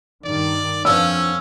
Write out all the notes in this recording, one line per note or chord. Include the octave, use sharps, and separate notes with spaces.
G2 D#3 D5
F2 F3 B3 C#4 D4 E6